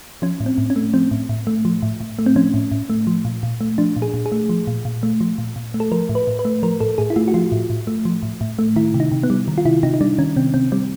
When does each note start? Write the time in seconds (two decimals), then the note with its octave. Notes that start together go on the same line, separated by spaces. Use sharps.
0.22 F3 C#4
0.40 A2
0.46 C4
0.58 A2
0.70 C#4
0.76 A3
0.93 F3 C4
1.11 A2
1.29 A2
1.47 A3
1.65 F3
1.82 A2
2.01 A2
2.19 A3
2.26 C4
2.36 F3 C#4
2.54 A2
2.71 A2
2.90 A3
3.07 F3
3.25 A#2
3.43 A#2
3.61 A3
3.78 F3 D4
3.96 A#2
4.02 G#4
4.14 A#2
4.26 G#4
4.32 A3
4.49 F3
4.67 A#2
4.85 A#2
5.03 A3
5.21 F3
5.38 A#2
5.56 A#2
5.74 A3
5.80 A4
5.92 F3 A#4
6.09 A2
6.15 B4
6.27 A2
6.39 B4
6.45 A3
6.63 F3 A#4
6.80 A2 A4
6.98 A2 G#4
7.10 E4
7.16 A3 F4
7.28 F#4
7.34 F3 F4
7.52 A2
7.70 A2
7.87 A3
8.05 F3
8.23 A2
8.41 A2
8.59 A3
8.76 D#3 E4
8.94 C3
9.00 D#4
9.12 C3
9.23 B3
9.30 G3
9.48 D#3
9.58 F4
9.65 C3 E4
9.83 C3 D#4
9.94 D#4
10.01 G3 D4
10.19 D#3 C#4
10.36 C3 C4
10.54 C3 C4
10.72 G3 C4